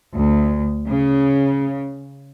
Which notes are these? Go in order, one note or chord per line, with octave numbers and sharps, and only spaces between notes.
D2
C#3